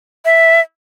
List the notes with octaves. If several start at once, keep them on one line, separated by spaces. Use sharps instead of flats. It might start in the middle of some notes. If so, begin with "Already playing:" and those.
E5